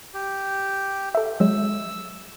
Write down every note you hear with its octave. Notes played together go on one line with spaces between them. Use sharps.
G4
A4 E5
F#3 G#3 E6